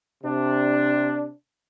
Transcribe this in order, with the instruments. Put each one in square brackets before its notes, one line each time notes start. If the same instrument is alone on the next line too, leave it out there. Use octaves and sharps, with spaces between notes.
[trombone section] C3 D4